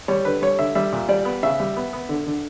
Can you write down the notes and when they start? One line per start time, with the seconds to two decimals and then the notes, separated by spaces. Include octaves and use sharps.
0.08 G3 C#5
0.25 D3 B4
0.42 G3 C#5
0.59 D3 E5
0.75 G3 E5
0.93 A#2
1.09 G3 D5
1.25 B3
1.43 C#3 E5
1.60 G3
1.76 B3
1.93 B3
2.09 D3
2.26 D3